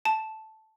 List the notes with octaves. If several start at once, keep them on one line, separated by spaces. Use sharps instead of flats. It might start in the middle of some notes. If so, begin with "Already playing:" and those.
A5